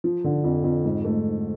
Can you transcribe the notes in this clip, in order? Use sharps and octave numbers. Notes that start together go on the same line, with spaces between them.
F3
D3
F2
F2
G#2
A3